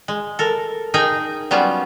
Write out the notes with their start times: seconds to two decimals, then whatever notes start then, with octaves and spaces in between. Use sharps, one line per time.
0.08 G#3
0.39 A4 A#4
0.94 D#4 G#4 A#4 G5
1.51 F#3 G3 B3 C#4 F4